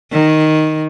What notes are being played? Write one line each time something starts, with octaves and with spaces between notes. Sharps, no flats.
D#3